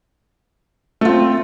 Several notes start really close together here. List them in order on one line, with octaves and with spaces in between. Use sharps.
A3 F4 C4